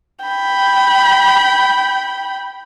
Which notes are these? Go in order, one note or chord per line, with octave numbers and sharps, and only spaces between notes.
G5 B5